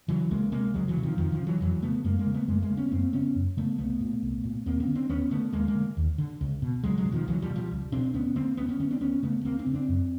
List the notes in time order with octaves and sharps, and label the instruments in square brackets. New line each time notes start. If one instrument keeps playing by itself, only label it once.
[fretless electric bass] C#3 E3 F#3
C#2 G#3 A#3
C3 G#3 A#3
C#2 F#3 G#3
E3 F#3
C3
D#3 F3
F2 D#3 F3
D#3 F3
C#3
E3 F#3
F2 E3 F#3
C#3 A3 B3
F#2 G#3 A#3
G#3 A#3
C#3
A3 B3
F#2 G#3 A#3
G#3 A#3
C#3
B3 C#4
F#2 A#3 C4
C#3 B3 C#4
F#2
C#3 A3 B3
C2 A3 B3
A#2
C2
A#2
D#2 A#3 C4
B3 C#4
D3
C4 D4
D#2 B3 C#4
D3 A3 B3
D#2 G#3 A#3
G#3 A#3
D3
D#2
D3
C#2
B2
C#2 F#3 G#3
F#3 G#3
B2
D#3 F3
C#2 E3 F#3
F3 G3
B2
F3 G3
C#2
B2 C4 D4
D2 B3 C#4
D3 A#3 C4
D2 B3 C#4
B3 C#4
D3 B3 C#4
C4 D4
D2 B3 C#4
C#3 A3 B3
D2 A#3 C4
C4 D4
C#3
C4 D4
F#2